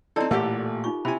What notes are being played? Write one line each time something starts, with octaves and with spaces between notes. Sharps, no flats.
F3 C4 D#4 E4 A4 D5 A5
A1 A#2 A3 G4 A4 A#4 E5 F#5
D#4 F4 C#6
C3 E4 G#5 B5